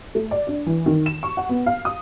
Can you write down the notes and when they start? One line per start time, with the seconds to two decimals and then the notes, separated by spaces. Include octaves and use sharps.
0.15 A3
0.31 D5
0.47 D4
0.66 E3
0.86 D#3
1.06 E7
1.23 C#6
1.37 F#5
1.49 B3
1.66 F5
1.85 D#6